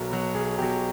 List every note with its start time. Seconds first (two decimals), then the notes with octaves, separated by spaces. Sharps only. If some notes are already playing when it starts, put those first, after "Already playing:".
Already playing: B1 B2 F#3 A#4
0.10 B2 F#3
0.34 B1 G#4
0.58 B2 F#3 G4